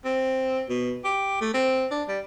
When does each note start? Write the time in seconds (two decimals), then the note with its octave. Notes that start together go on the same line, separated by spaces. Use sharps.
0.05 C4
0.69 B2
1.05 G4
1.41 A3
1.54 C4
1.91 D4
2.08 G3